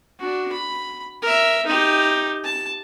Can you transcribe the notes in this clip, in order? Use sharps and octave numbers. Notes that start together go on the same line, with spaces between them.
D4 F#4
B5
A#4 E5
D#4 G4
A5